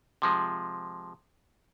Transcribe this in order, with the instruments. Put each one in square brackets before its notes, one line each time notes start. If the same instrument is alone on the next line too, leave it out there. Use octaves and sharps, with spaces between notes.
[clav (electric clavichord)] C3 F3 G#3